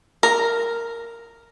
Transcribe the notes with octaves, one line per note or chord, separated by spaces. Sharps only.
A#4